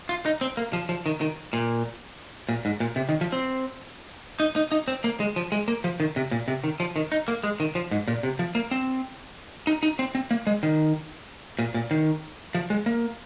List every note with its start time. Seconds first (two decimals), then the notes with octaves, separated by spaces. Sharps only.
0.09 F4
0.26 D#4
0.41 C4
0.57 A#3
0.73 F3
0.89 F3
1.06 D#3
1.21 D#3
1.53 A#2
2.49 A#2
2.65 G#2
2.80 A#2
2.96 C3
3.09 D#3
3.21 F3
3.32 C4
4.40 D#4
4.56 D#4
4.72 D#4
4.88 C4
5.04 A#3
5.20 G#3
5.36 F3
5.52 G#3
5.68 A#3
5.84 F3
6.00 D#3
6.16 C3
6.31 A#2
6.48 C3
6.64 D#3
6.80 F3
6.96 D#3
7.12 D#4
7.28 A#3
7.44 G#3
7.60 D#3
7.75 F3
7.91 G#2
8.08 A#2
8.23 C3
8.39 F3
8.55 A#3
8.71 C4
9.67 D#4
9.83 D#4
9.99 C4
10.15 C4
10.31 A#3
10.47 G#3
10.63 D#3
11.59 A#2
11.74 A#2
11.91 D#3
12.55 F3
12.70 G#3
12.86 A#3